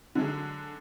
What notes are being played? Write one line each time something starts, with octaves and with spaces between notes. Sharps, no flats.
D3 F#3 G#3